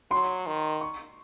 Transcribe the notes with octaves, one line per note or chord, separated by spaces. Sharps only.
F#3 C6
D#3
C#6